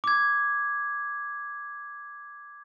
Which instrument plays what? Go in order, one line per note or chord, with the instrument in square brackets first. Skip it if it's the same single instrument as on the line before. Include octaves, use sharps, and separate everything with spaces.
[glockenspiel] D6 G#6